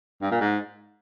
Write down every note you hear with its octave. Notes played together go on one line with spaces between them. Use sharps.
G2
A#2
G#2